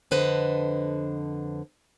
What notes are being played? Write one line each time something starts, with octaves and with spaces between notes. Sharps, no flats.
F2 D3 B4 C5 D#5